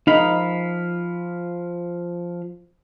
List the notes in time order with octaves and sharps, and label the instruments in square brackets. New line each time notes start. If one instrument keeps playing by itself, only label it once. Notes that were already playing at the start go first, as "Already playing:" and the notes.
[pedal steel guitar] F3 F5 B5 [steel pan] D#4